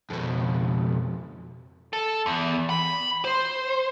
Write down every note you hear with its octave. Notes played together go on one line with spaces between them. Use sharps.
F2 B2
A4
E2
B5
C5